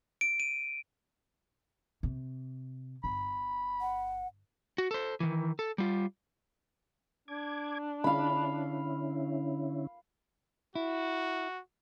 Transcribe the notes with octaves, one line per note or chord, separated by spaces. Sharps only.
D7
D#7
C3
G1 B5
F#5
F#4
A4 C5
D#3 E3
A4
G3 F4
D4 D6 G#6
D3 C#4 E4 F5 B5
E4 F#4